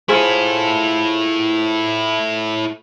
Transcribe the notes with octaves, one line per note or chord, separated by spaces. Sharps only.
E4 F4 G#4 A4 C5